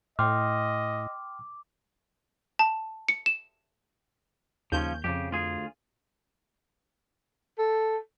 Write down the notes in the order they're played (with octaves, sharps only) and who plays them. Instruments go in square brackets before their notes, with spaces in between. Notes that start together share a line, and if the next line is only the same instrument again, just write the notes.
[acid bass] A2 [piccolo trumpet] D#5 [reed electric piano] G5 C6 F6 [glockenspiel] D6
[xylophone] A5
C#7
E7
[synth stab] D#2 G6 [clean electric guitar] C#3 F3 C#4
[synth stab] F2 [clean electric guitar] C#3 G4
[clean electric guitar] D2 F4 G#4
[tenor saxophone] A4